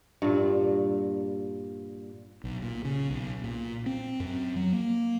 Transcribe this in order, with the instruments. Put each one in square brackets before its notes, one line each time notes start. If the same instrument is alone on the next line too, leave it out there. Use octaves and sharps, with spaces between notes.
[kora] G2 A#2
[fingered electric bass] B1
A#2
C#3
B1
A#2
C4
F#2
F#3
A#3